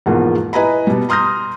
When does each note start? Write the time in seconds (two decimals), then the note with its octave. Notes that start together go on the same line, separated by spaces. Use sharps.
0.06 E2 G#2 B2 F3 A#3
0.53 E4 B4 D#5 G#5 A#5 B5
0.87 B2 G3
1.09 A#5 C6 D#6 F6 G6 A#6